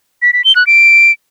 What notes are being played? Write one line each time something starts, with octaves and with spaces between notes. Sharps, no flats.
B6
B6
G7
F#6
D7